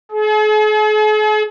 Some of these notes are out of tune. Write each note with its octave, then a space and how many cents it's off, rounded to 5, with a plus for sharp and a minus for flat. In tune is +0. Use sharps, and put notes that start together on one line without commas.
G#4 +45